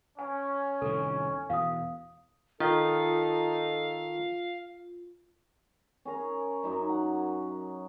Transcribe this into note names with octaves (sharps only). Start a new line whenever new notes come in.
C#4 G#5
C2 A2 D#3 A4
E2 B2 F5 D#6
D#3 D#4 F4 A4 F5
C#4 G#4 A#4
F#2 D#4 E5
F#5